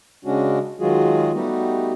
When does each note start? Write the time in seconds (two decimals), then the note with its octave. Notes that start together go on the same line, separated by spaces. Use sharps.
0.25 C#3 G#3 C#4 D4 F#4
0.80 D#3 F#3 G#3 F4 F#4 G#4
1.34 G3 A3 B3 D#4 F#4 G4